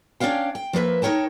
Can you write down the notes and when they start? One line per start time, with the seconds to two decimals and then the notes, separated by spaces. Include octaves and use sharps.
0.20 C#4 D4 F4 C#5 F5 G5
0.55 G5
0.73 F3 A#3 B4 E5
1.02 D#4 A#4 C#5 G5 A5